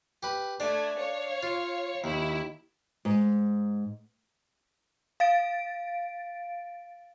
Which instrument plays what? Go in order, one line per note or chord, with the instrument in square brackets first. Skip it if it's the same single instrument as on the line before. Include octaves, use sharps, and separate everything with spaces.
[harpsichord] G4 B4
[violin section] A3 G#6 [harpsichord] D4
[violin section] C#5 F5
[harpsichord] F4
[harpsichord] D#2 [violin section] E4
[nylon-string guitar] G#2
[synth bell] F5 A6 D7